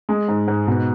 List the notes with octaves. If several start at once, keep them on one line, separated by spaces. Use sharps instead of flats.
G#3
G#2
G#2
B2